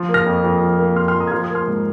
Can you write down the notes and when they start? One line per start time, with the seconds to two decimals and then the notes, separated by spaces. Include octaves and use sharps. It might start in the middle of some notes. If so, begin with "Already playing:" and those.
Already playing: F3
0.09 A#3
0.14 F6 A#6
0.26 F2
0.44 F2
0.61 F3
0.79 A#3
0.96 F2 C6 F6
1.08 C6 F6
1.15 F2
1.20 A#5 D#6
1.27 G#6
1.32 F3 C6 F6
1.43 D#6 G#6
1.50 A#3
1.55 C6 F6
1.67 G#2